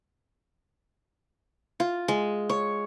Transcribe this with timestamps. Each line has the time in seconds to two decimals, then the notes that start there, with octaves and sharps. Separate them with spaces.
1.80 F4
2.08 G#3
2.50 C#5